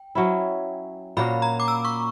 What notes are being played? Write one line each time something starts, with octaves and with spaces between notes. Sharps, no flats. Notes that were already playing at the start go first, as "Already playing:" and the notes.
Already playing: G5
F#3 C#4 E4
A#2 A#3 C#4 F#4 B5
A#5
D6
E6
C#6